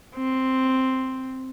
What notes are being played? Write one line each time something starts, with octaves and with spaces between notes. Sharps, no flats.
C4